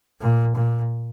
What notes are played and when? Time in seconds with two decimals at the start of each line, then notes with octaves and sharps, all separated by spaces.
0.21 A#2
0.55 A#2